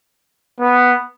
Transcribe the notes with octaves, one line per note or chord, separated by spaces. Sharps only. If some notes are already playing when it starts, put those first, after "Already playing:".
B3